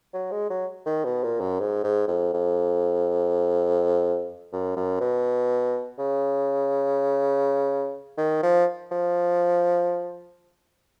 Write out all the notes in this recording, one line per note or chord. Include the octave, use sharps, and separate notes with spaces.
F#3
G#3
F#3
D#3
B2
A#2
F#2
G#2
G#2
F2
F2
F#2
F#2
B2
C#3
D#3
F3
F3